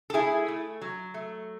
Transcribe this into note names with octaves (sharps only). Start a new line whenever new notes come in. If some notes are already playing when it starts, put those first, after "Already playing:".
A4
A3 E4 G#4
A3
F#3
A3